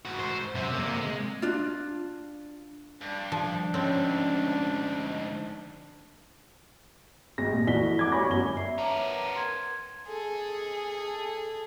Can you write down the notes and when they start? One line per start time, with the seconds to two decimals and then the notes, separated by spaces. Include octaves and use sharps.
0.05 G#2 F#4
0.19 C5
0.55 F#2 C3
0.73 D3 A#3
1.01 G#3
1.42 D4 F4
3.02 G2 D4
3.32 F3
3.74 D2 G#2 C4 C#4
7.38 G#1 G#3 A#6
7.52 A#1
7.67 F2 E3 F#4 D5 B6 G7
7.99 F#5 D6 G#6
8.12 C#5 G#5 B5 C#6 A#6
8.28 G1 F#2 G7
8.57 D5 E5 C7
8.79 B3 A#4 C#5 A5 D6
9.35 C6 G#6
10.07 G#4 A4